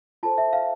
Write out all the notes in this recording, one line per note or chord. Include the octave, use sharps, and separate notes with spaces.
F4 A4 C5 A5
E5
F5